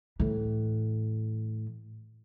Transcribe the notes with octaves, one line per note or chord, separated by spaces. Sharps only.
A2 E3